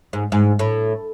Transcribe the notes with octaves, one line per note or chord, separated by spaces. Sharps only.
G#2
G#2
A2